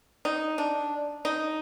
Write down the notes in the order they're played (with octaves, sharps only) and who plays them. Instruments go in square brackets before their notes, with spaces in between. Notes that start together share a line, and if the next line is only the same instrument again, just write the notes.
[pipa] D#4
D4
D#4